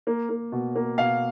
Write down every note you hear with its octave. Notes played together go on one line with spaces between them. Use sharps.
A#3
A#3
B2
A#3
B2 F5